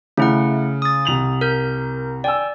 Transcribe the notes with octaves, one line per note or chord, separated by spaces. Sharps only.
C#3 A3 E4 F#5
D#6 A6
C2 F7 F#7
A#4 G6
D5 G5 G#5 E6